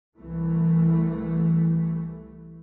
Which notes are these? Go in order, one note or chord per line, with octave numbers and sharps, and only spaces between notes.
C2 E3 A3